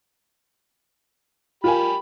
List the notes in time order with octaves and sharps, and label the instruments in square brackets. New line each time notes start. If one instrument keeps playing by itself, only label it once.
[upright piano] F4 A#4 G#5 [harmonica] G4 B5